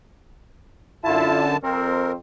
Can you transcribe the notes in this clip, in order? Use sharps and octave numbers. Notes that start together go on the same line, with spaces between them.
F#2 D3 E4 F4 A5
F2 C4 A#4